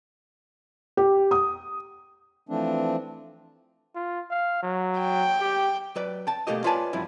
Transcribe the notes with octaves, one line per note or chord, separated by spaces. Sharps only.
G4
D#6
E3 F3 A3 C4 D4
F4
F5
F#3
G5
G4
F#3 B4 D5
G5 A5
B2 D#3 A3 A#3 G4 D#5
F4 B4 C#5 D5 G#5 A5
C2 F#2 F3 G3 E4